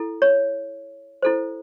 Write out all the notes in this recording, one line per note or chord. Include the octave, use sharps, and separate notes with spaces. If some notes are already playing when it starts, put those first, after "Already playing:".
Already playing: E4 A4
C#5
E4 A4 C5